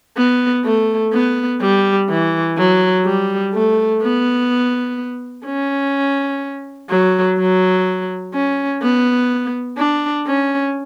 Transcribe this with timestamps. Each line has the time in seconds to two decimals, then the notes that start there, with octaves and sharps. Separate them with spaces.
0.17 B3
0.64 A3
1.13 B3
1.61 G3
2.09 E3
2.57 F#3
3.05 G3
3.53 A3
4.02 B3
5.45 C#4
6.90 F#3
7.38 F#3
8.34 C#4
8.82 B3
9.77 D4
10.26 C#4